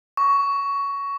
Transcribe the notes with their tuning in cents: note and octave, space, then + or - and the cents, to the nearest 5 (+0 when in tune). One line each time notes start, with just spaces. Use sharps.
C#6 +15